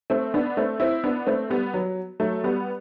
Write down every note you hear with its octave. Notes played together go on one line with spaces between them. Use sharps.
A3 C4
B3 D4
A3 C4
C4 E4
B3 D4
A3 C4
G3 B3
F#3
F#3 A3
G3 B3